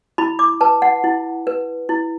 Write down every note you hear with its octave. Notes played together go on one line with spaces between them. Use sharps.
E4 B5
D6
B4 A5
F#5
E4
B4
E4